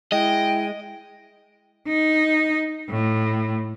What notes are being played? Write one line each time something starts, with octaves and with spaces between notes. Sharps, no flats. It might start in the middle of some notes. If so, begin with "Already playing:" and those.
G#3 E4 D#5 G5
D#4
A2